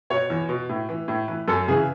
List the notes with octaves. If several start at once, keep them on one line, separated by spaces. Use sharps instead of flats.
B2 C#5
E2
B2
A2
E3
A2
E3 B4
F#2 A4
C#3 E3 G#4